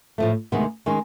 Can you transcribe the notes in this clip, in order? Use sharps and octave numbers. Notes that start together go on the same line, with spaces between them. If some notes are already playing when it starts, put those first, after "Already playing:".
A2 F3 A3
D2 C3 D#3 G#3 B3
D#3 G#3 C#4